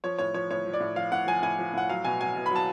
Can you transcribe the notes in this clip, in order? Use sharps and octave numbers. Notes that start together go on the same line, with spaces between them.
F3 C#5
A2 C#5
F3 C#5
A2 C#5
F3
D5
A2
F3 F5
A2 F#5
F3 G#5
A2 G#5
F3
A2 F#5
F#3 F5
B2 G#5
F#3 G#5
B2
B5
F#3 A5